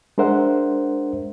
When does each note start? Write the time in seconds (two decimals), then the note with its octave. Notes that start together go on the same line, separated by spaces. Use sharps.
0.18 G#3 D4 A#4 C5 E5 F#5